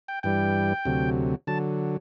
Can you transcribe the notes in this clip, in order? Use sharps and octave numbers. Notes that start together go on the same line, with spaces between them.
G5
G2 E3 G3 G5
D2 C3 F#3
D3 F#3 A5